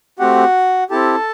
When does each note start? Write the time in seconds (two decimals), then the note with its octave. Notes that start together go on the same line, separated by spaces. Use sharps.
0.19 A3 C4 F#4 G4 F#5
0.90 C4 E4 G4 A4 A5